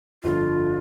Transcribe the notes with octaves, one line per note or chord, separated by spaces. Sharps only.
G1 F2 D3 F4